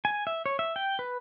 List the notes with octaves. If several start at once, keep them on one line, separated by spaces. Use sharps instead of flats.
G#5
E5
C#5
E5
G5
B4